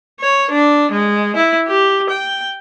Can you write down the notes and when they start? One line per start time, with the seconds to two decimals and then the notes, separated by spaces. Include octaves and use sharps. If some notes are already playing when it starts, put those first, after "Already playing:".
0.20 C#5
0.51 D4
0.92 G#3
1.36 E4
1.67 G4
2.09 G5